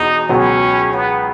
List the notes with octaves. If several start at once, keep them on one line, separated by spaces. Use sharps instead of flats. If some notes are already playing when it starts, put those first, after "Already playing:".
Already playing: E1 E2 B2 D#4
C#2 B2 F#3 B3 C#4
B3